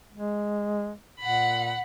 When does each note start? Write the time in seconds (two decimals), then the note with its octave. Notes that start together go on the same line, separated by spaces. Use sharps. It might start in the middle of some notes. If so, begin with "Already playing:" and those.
0.13 G#3
1.20 A#2 F#5 B5